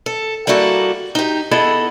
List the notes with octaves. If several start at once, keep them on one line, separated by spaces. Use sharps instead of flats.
A4
G3 A#3 E4 F#4 A4
D#4 G4
B3 E4 G#4 A4 D#5